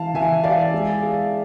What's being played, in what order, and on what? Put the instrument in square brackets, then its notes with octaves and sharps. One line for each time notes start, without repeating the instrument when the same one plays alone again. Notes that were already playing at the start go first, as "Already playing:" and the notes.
Already playing: [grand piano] E3 E4 [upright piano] F5 A5
[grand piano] E3 [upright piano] E5 G#5
[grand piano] E4 [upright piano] D5 F5
[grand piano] G#3
G#4